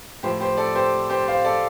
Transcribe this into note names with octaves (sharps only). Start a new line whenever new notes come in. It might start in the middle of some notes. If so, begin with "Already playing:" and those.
A2 F3 G4 C5
G4 C5
A4 D5
G4 C5
G4 C5
C5 F5
A4 D5